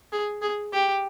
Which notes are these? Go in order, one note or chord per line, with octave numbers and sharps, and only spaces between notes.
G#4
G#4
G4